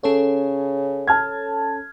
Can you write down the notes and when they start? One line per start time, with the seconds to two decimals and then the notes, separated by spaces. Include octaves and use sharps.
0.03 C#3 C#4 A4 C#5
1.07 A5 F6 G#6